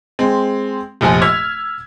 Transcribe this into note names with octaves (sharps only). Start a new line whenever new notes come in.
G#3 C4
F1 A#1 F3 G#5
E6 F6 G#6 B6